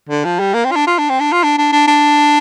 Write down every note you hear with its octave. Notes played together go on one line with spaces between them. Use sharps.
D3
F3
G3
A#3
C4
F4
D4
F4
D4
C4
D4
F4
D4
D4
D4
D4